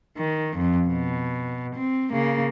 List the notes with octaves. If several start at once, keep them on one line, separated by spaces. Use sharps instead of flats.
D#3
F2
B2
C4
C#3 A#3